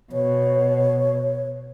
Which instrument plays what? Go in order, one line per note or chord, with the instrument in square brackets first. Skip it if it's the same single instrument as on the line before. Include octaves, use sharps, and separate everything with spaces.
[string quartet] B2 [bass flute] C#5